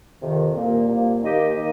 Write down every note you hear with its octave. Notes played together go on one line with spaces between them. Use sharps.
F2 C3 D#3
C2 A#2 A#3
C2 A#2 A#3
D#2 D#3 A#3 G4 D#5
D#3 A#3 G4 D#5